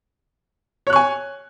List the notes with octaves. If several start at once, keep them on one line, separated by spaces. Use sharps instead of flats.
C#5 G#5 C#6 F#6